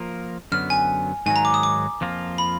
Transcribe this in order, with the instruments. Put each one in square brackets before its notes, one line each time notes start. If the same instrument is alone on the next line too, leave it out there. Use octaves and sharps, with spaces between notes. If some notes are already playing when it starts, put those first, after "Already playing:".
Already playing: [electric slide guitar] F3 A#3 F4 A#4
[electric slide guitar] F#2 D3 F#3 B3 [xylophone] F6
[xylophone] G#5
[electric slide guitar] G#2 D#3 F#3 [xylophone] G#5
[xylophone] A#5
D6
D#6
D6
[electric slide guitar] F2 F3 A#3 F4
[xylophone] B5